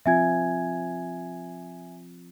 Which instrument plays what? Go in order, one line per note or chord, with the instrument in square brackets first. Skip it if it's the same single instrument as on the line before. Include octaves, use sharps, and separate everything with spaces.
[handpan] F3 C4 F4 [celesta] E5 G#5 G#6